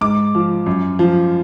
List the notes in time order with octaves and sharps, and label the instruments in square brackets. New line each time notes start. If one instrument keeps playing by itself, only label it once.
[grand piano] G#2 D6
F3
F#2
F3